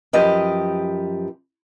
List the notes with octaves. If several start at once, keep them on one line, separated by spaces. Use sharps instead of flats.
F#2 F3 G4 B4 D#5